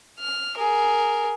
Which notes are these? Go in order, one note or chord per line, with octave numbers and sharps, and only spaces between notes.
F6
G#4 A#4